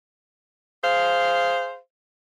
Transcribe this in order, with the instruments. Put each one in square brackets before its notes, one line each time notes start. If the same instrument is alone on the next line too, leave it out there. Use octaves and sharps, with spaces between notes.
[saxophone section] G#4 C5 F5